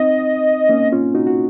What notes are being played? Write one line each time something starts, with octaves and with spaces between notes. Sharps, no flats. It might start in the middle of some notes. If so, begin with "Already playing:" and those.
Already playing: C4 D#4 D#5
A#3 C#4
C#4 F4
D#4 F#4
F#4